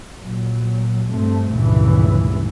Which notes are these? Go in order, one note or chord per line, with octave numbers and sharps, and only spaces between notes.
A#2 F#3
G2 A3 C4
F1 C#2 G2 A#2 E3